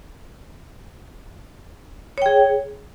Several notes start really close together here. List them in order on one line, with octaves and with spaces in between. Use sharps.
C#5 G5 G#4